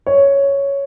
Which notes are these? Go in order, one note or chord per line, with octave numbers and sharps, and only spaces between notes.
C#5